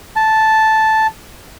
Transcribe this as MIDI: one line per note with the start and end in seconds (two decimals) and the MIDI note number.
0.16 1.07 81